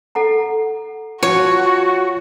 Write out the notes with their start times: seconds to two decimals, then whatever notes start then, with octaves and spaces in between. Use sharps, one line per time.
0.15 A4 F#5 A#5
1.23 F3 F#4 C#5